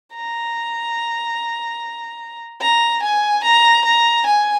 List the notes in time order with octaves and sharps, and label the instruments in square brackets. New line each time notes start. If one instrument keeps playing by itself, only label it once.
[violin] A#5
A#5
G#5
A#5
A#5
G#5